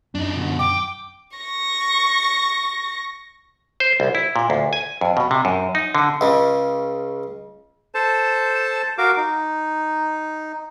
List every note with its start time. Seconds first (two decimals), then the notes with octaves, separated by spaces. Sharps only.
0.15 F#2 D4 D#4
0.36 B2 D3
0.59 G5 D6
1.38 C#6 A#6
3.80 C5
4.00 C2
4.15 E4
4.36 A#2
4.50 D2
4.73 G#5
5.01 F2
5.17 B2
5.31 C3
5.45 F#2
5.75 D#4
5.95 D3
6.21 C#2 C#3
7.94 A4 C5 A5
8.98 F#4 A#4 F5 D6
9.17 D#4